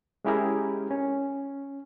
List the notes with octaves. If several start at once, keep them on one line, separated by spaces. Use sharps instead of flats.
G#3 C#4 E4 G4 G#4 A#4
C#4